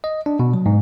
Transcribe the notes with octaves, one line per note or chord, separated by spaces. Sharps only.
D#5
D4
B2
F#3
G#2